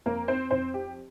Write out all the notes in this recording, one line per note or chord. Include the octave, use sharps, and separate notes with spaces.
F2 A#3 A#4
C4 C5
F2 C4 C5
G4